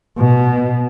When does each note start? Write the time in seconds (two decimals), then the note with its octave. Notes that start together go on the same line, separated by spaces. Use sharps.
0.19 B2